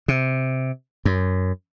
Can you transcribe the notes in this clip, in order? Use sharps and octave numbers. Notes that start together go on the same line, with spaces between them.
C3
F#2